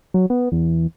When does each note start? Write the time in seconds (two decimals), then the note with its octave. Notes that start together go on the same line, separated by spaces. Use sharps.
0.14 F#3
0.30 B3
0.52 E2